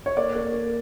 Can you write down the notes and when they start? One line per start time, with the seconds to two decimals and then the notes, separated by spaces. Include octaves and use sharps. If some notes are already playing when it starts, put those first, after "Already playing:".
0.06 C#5
0.17 A#3 D5
0.35 A#3
0.53 A#3